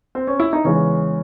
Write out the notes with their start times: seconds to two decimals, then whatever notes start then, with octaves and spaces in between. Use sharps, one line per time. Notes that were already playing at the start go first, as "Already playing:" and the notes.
0.15 C4
0.27 C#4
0.40 E4
0.53 D#4
0.64 E2 C#3 E3 G#3 C#4